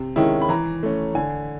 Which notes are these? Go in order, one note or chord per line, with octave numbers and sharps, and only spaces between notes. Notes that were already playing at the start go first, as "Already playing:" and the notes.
Already playing: C3
D#3 G#3 C#4 E4
B5
E3 A#5
A3 C#4
D3 G#5